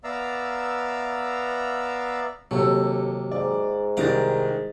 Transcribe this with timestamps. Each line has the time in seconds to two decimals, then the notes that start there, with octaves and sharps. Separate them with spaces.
0.04 B3 D5 E5 F5 A#5 E6
2.51 D#2 C3 F#3 A#3 A4 E6
3.32 G#2 D5
3.97 C2 D#3 G3 F5 A#5 D6 A6